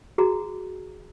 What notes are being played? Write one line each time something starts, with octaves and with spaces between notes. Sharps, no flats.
F#4 G#4 A#5